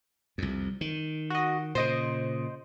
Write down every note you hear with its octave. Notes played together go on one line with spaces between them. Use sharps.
C2 F2
D#3
F#4 D#5
A#2 C#3 C5 D#5